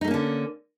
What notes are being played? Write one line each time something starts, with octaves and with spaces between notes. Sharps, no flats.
D3 A3 A#3 C#4 D#4